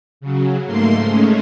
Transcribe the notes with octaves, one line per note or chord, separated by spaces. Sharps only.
C#3 F#3
G#2 A3 A#3 C6
G#3 A3 C#4